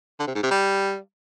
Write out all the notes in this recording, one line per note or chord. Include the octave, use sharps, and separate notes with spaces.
D3
C3
G#2
C3
G3